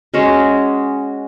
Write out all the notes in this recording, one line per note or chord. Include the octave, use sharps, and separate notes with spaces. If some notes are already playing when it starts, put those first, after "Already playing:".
G#3 C#4 F#4